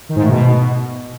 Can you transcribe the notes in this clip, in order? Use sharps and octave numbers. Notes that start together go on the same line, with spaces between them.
D#3
G#2
A2
B2